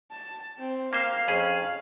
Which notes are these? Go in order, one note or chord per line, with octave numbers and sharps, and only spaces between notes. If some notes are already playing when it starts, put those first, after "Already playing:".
A5
C4
A#3 C5 F5
F2 C#4 G#4